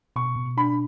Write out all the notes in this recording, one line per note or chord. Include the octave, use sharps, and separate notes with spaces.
B2 C#6
B2
D4 B5